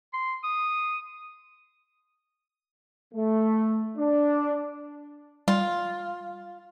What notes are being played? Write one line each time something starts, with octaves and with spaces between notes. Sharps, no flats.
C6
D#6
A3
D4
G3 F4